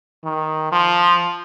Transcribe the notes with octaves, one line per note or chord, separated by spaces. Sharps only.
D#3
F3